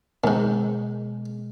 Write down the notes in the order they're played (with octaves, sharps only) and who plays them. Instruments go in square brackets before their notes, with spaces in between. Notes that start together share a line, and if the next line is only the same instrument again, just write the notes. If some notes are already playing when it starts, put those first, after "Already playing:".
[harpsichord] D#2 G#2 [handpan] B2 G#3